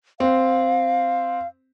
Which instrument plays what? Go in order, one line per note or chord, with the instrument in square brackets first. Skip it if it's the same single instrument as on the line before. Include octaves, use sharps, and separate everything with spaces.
[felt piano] C4 [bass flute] F5